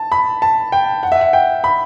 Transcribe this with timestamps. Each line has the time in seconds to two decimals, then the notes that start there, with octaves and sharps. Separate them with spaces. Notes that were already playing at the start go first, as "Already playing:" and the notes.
Already playing: A5
0.12 B5
0.42 A5
0.72 G5
1.03 F#5
1.12 E5
1.21 F#5
1.33 G5
1.64 B5